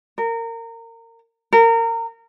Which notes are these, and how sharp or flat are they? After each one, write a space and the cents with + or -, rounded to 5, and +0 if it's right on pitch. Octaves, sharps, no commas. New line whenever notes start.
A#4 -25
A#4 -25